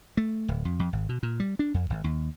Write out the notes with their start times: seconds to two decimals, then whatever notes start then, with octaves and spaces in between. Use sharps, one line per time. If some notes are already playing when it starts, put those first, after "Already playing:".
0.17 A3
0.48 D1
0.65 F2
0.79 F2
0.93 G#1
1.09 B2
1.23 A#2
1.40 G3
1.59 D4
1.74 F2
1.90 G#1
2.04 D#2